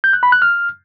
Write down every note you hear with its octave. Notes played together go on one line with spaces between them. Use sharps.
G6
F#6
B5
F#6
F6